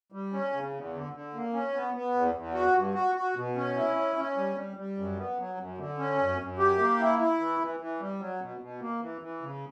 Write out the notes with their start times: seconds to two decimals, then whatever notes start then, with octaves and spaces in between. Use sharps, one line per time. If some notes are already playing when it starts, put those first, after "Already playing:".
0.12 G3
0.33 C#4
0.53 C#3
0.73 E2
0.93 D3
1.13 D3
1.34 A#3
1.53 C#4
1.73 B3
1.94 B3
2.14 E2
2.34 E2
2.54 F#4
2.75 G2
2.95 F#4
3.15 F#4
3.35 B2
3.56 C#4
3.76 E4
3.96 C#4
4.16 C#4
4.36 G3
4.57 G3
4.77 G3
4.97 F#2
5.17 B3
5.38 F#3
5.58 F#2
5.78 D3
5.98 C#4
6.18 F#2
6.38 F#2
6.58 G4
6.79 A#3
6.99 E4
7.19 E4
7.40 E3
7.60 E3
7.80 E3
8.00 G3
8.20 F#3
8.40 B2
8.61 B2
8.81 A#3
9.01 E3
9.21 E3
9.41 C#3